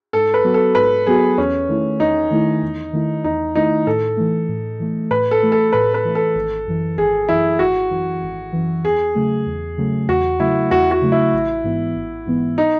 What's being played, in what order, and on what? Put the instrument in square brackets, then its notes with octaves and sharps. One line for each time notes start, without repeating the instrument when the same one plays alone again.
[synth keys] G#2 [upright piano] A4
[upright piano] B4
[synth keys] F#3 B3 F#4
[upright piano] A4
[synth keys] G#2 [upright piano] B4
[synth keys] F#3 B3 F#4 [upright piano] G#4
[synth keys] E2 [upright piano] C#4
[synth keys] D#3 A3 E4
[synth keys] E2 [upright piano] D#4
[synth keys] D#3 A3 E4
E2
D#3 A3 E4
[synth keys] E2 [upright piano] D#4
[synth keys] D#3 A3 E4 [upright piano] D#4
[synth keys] A2 [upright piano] A4
[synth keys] E3 A3
A2
E3 A3
[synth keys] A2 [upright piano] B4
[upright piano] A4
[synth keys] E3 A3
[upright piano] A4
[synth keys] A2 [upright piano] B4
[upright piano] B4
[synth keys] E3 A3
[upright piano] A4
[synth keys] G#1
F#2 E3
[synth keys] G#1 [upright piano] G#4
[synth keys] F#2 E3 [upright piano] E4
[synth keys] G#1 [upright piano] F#4
[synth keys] F#2 E3
G#1
F#2 E3
[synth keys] E2 [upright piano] G#4
[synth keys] C#3 F#3 A3
E2
C#3 F#3 A3
[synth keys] E2 [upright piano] F#4
[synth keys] C#3 F#3 A3 [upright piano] E4
[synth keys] E2 [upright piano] F#4
[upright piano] F#4
[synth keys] C#3 F#3 A3
[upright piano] E4
[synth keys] A1
G#2 E3 B3
A1
G#2 E3 B3
[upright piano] D#4